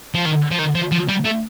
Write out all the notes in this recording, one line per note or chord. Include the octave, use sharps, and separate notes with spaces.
F3
D#3
F3
D#3
F3
F3
G3
A3